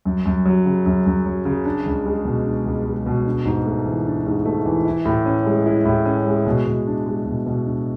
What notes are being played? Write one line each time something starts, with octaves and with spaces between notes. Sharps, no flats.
F#2
F#2
F#3
C#3
F#2
F#2
F#3
C#3
D4
C#2
G#3
B2
D4
C#2
G#3
B2
D4
G#2
A3
E3
D4
G#2
A3
E3
E4
A2
C#4
G#3
E4
A2
C#4
G#3
B2
B2
D4
G#3
B2
B2
D4